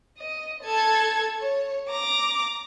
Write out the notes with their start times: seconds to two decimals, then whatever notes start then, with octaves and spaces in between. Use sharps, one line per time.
0.18 D#5
0.63 A4 G#6
1.41 C#5
1.90 A#5 D6